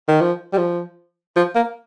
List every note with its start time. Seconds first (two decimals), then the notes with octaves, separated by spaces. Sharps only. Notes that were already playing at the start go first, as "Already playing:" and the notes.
0.08 D#3
0.21 F3
0.53 G3
0.57 F3
1.36 F3
1.55 A#3